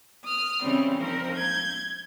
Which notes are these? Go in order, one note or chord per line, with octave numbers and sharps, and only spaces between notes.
D#6 F6
C#3 E3 G3 C4
F3 C4 D#4 A#4 C5
G6 G#6